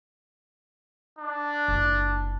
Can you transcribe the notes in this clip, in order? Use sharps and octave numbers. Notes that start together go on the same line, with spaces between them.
D4
F#1